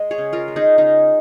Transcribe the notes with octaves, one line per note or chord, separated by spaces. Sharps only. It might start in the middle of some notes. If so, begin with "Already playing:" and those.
Already playing: G#3 D#5
G#4 C#5
C#3
F4 A#4
G#3
D#4 G#4
C#3 D#4